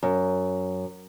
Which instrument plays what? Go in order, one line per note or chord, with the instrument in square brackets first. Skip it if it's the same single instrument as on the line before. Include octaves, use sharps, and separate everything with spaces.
[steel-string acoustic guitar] F#2